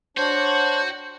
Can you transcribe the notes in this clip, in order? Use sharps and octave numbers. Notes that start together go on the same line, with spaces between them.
D4 F#4 C5 C#5 G6